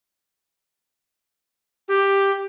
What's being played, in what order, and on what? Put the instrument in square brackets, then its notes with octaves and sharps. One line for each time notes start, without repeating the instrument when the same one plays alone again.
[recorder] G4